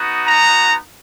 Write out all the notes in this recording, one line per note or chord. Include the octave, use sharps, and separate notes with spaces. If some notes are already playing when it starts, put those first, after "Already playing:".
Already playing: B3 D#4 F#4
A#5